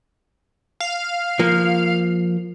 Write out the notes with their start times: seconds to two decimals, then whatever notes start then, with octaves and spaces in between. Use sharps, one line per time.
0.80 F5
1.39 F3 A#3